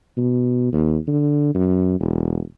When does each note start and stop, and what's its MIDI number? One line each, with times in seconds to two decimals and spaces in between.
0.17 0.68 47
0.73 0.97 39
1.07 1.52 50
1.54 1.95 42
2.00 2.40 28